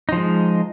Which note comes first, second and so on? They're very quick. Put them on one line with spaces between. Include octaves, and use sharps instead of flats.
D#4 F3 G#3